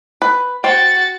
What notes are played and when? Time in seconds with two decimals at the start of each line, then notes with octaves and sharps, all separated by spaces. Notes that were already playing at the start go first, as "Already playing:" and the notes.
0.22 B4
0.64 F#4 C5 G5 A6